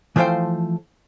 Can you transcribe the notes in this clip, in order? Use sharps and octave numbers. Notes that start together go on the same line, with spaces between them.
E3 F3 A3 C5 F5 G5